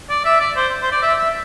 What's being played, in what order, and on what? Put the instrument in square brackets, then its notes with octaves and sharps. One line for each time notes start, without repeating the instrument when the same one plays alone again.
[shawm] D5
E5
D5
C5
C5
D5
E5
E5